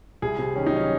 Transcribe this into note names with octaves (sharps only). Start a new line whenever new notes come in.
C2 G#4
C3
D#3 C#4
D#4
F#3 C#4